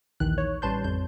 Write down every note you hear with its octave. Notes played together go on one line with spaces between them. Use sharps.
A#1 D#2 D#3 E3 F#6
C#5
A1 G3 B4 A5 C6 G6
F2 G6